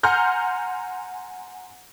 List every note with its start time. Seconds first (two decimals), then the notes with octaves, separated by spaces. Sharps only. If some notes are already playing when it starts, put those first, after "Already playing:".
0.03 F#5 G#5 A#5 C6 F6 G6